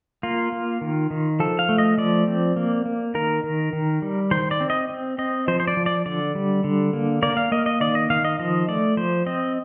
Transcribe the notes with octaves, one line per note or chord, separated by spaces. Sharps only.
A#3 F4
A#3
D#3
D#3
F3 A4
F5
A3
D#5
F3 D5
C4
A#3
A#3
D#3 A#4
D#3
D#3
G3
D#3 C5
D5
C4
D#5
C4
C4 D#5
F3 C5
C5
D5
F3
D5
D3 D5
G3
D3
A#3
A#3 D5
F5
A#3 D#5
D#5
D#3 D5
D#5
D#3 F5
D#5
F3 D#5
A3 D5
F3 C5
C4 D#5